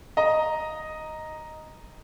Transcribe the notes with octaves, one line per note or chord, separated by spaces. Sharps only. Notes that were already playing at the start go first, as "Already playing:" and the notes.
D#5 A#5